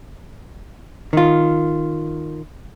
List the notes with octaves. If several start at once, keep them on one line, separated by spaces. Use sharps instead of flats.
D#3 F4